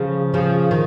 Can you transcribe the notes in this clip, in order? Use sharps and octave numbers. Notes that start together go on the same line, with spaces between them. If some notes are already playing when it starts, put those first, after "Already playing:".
Already playing: C#3 F3
C#3 F3
D#3